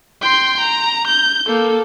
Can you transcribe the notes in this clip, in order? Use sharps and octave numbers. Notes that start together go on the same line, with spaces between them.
G5 C6
A#5
G6
A#3 A4